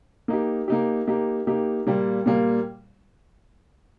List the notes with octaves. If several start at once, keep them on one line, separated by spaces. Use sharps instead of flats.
A#3 D#4 G4
A#3 D#4 G4
A#3 D#4 G4
A#3 D#4 G4
A#2 G3 A#3
A#2 G3 A#3